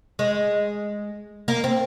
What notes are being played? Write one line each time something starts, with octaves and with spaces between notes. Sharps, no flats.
G#3
A#3
C4